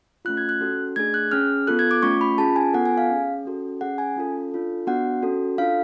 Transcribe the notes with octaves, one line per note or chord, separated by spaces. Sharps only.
A3 C#4 F4 F#6
G#6
F#6
C#4 F#4 A4
A3 D4 G#4 G#6
F#6
C#4 G#4 F6
B3 F4 A4 F#6
G#6
D6
A3 C#4 F4 C#6
B5
C#4 F4 G#4 A5
G#5
B3 F4 A4 F#5
G#5
F5
C#4 G#4
C#4 F#4 A4
C#4 G#4 F#5
G#5
C#4 F4 A4
D4 F4 A4
B3 D4 F#4 F#5
C#4 F#4 A4
D4 F4 A4 F5